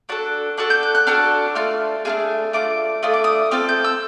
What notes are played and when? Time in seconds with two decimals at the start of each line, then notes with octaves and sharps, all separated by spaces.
0.09 D4 F#4 A4 F#6
0.58 D4 F#4 A4 F#6
0.70 G6
0.83 F#6
0.95 F#6
1.07 D4 F#4 A4 F6
1.55 A3 D4 F4 F6
2.05 A3 D4 F4 G#4 F6
2.53 A3 D4 F4 D6
3.03 A3 D4 F4 D#6
3.14 D6
3.24 D#6
3.51 C4 F4 A4 F6
3.69 G6
3.84 E6